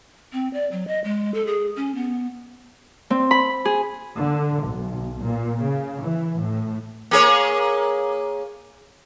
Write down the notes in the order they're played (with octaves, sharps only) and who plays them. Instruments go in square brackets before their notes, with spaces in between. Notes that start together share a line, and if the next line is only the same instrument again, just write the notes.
[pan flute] C4
D5
F#3
D#5
G#3
A4
G#4
C#4
B3
[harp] C4
B5
G#4
[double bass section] D3
B1
A#2
C#3
E3
A2
[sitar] A#3 G#4 C#5